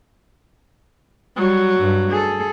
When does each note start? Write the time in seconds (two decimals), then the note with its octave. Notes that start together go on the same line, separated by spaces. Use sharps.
1.37 F#3 G3
1.80 G2
2.11 G#4 A4